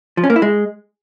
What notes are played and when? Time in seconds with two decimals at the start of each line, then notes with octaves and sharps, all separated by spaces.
0.17 F3
0.24 C#4
0.30 A#3
0.36 E4
0.42 G#3